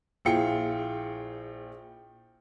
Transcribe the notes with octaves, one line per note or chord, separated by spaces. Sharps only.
A#1 E4 F4 G#4 G5 C#7